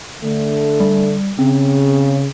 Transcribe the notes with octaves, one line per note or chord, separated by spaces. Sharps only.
D3 A3
G3
C#3 C4